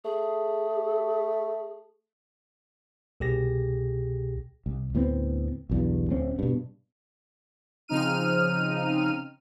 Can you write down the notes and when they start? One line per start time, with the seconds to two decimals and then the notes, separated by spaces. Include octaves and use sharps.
0.05 A3 G#4
3.20 C2 B2 G4 G#4 A#6
4.66 C2
4.95 D2 A2 B3 C4
5.69 B1 E2 G2
6.10 D1 A3 C4 C#4
6.39 G2 B2
7.88 C#3 F3 C4 D#4 F6 D#7